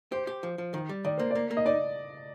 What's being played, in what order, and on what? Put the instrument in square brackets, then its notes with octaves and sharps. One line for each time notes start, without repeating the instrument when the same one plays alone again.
[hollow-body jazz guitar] G4 [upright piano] C5
[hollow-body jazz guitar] G4
F3
F3
D#3
G3
[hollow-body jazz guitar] D#3 [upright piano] D5
[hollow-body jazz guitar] A#3 [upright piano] C5
[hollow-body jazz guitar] A#3 [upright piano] D5
[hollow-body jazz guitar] A#3
[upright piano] D#5
[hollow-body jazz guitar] D#4 [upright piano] D5